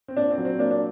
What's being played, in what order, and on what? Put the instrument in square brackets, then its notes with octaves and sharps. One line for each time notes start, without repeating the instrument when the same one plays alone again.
[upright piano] C4
[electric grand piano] A#2 [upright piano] D4
[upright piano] C4
[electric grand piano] F#3
[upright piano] C4
[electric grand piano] A#3 [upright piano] D4
[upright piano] D4